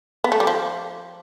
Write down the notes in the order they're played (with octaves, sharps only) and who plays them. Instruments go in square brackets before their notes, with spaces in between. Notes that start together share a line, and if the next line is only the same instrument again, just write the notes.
[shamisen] B3
A3
G3
F3